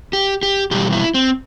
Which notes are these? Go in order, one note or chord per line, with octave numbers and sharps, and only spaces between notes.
G4
G4
E2 B2 G3 G4
E4
C4